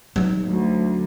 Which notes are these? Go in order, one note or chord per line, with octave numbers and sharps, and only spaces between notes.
F#3 D#4
D2